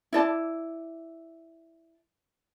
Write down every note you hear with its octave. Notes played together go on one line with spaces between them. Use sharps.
E4 D5 A5